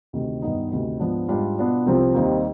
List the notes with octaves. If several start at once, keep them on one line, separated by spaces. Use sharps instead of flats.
D2 C3 D#3
G2 D#3 B3 D#4
D2 C3 D#3
G#2 F3 B3 D4
G#2 G3 D4 F4
B2 B3 D4 F4
C2 C3 F3 C4 F4
D#2 D#3 G3 C4 D#4